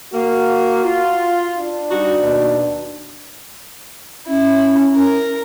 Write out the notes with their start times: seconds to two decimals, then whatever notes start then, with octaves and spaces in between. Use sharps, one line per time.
0.13 A#3 F#4
0.83 F4
1.57 D4
1.90 G3 D#4 F#4
2.22 D#2 B2
4.27 C#4 E4
4.94 A#4